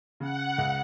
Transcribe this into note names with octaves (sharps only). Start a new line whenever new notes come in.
C#3 F#5
C#2